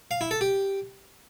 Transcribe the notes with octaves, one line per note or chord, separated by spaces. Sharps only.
F5
E4
A4
G4